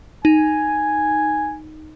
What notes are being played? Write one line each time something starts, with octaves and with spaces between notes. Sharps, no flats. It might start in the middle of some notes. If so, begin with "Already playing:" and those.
D#4 G#5